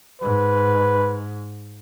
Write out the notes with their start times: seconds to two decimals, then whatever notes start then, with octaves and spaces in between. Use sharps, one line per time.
0.21 G#2 B4